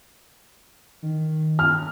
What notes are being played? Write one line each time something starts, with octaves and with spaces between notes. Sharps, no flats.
D#3
F6